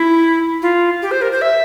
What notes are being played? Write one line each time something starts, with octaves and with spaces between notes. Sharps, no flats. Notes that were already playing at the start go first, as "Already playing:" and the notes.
Already playing: E4
F4
G4
C5
A#4
C5
E5